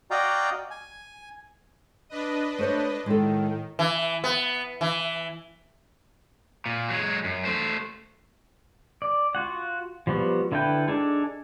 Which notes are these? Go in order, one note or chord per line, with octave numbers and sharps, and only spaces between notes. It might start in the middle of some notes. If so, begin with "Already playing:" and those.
F#4 D5 D#5 F5 G5 A#5
G#5
D4 B4 D#5
A3 C5 C#5
A2 D#3 G#3 A4
E3
B3
E3
A#2
F#3 G#3
F#2
A3 C5
D5
F4 F#4 F#5
F3 G3 B3 F#4
D3 E4 A4 B4 G5
D4 D#4 G#4 A4